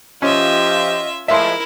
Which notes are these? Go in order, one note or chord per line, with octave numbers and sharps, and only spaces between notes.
F3 C#4 F4 G4 D#5 E5
F3 G#3 A3 E4 A#4 E5 C6